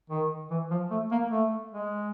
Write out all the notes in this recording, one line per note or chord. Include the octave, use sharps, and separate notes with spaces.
D#3
E3
F3
A3
A#3
A3
G#3